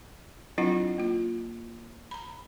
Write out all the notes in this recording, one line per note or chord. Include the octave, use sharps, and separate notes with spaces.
F#3 C4 D4 E4 F4 F#5
A#3 F4
A#5 B5